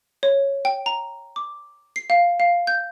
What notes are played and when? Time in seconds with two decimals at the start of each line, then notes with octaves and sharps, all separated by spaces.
0.23 C#5
0.65 G5
0.86 A#5
1.36 D6
1.96 C7
2.10 F5
2.40 F5
2.67 G6